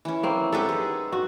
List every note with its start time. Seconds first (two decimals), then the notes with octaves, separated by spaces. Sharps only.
0.05 E3 C#4
0.23 A#3 C4
0.52 G#3 D#4 G4 A4 B4 F#5
0.69 G#4
1.12 F#4